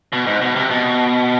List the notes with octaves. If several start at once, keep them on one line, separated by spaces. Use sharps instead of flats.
B2
G#2
B2
C3
B2